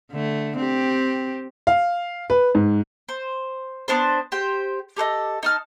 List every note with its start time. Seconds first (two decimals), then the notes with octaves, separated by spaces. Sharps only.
0.11 D3 A3
0.57 C4 G4
1.67 F5
2.30 B4
2.55 G#2
3.09 C5
3.88 B3 D4 C5
4.32 G4 C5 G5
4.96 G4 A4 C5 D#5
5.43 D#4 A5 F6